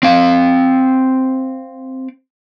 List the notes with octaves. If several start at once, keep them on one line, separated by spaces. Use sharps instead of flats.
C4 F5